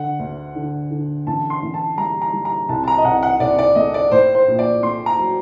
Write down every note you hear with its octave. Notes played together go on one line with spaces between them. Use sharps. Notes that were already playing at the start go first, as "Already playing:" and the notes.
Already playing: D3 F#5
D2
D3
D3
A1 A5
C6
A1
A5
G3 A#5
A#5
G3
A#5
C2 A5
A5
A#5
D#5
C2 F#5
F#5
C2 D5
D5
A3 D#5
D5
A2 C5
C5
A#1
D5
A3 C6
A#5
F#3